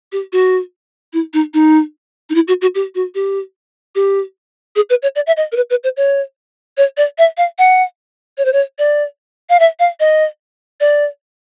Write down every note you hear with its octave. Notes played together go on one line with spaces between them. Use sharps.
G4
F#4
E4
D#4
D#4
D#4
E4
F#4
F#4
G4
F#4
G4
G4
G#4
B4
C#5
D5
E5
D#5
A#4
B4
B4
C5
C#5
C#5
D5
E5
F5
F#5
C#5
C5
C#5
D5
F5
E5
F5
D#5
D5